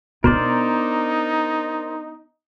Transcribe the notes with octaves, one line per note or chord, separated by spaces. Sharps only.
B2 B3 D4 D#4 A#4 C5 D5